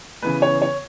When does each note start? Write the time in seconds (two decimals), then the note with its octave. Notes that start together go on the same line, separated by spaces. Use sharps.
0.22 C#3 E3 B3 B4
0.42 C#5
0.62 C#5